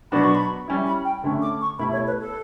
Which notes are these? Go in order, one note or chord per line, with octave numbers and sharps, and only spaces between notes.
B2 F#3 B3 D4 F#4 B5
C#6
B5
G3 C#4 E4
B5
G5
D3 A3 C#4
D6
C#6
B2 A3 E4 G4 B5
C#5
B4
A4